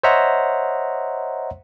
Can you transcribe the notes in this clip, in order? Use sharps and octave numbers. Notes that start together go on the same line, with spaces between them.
C5 C#5 D#5 E5 F#5 A#5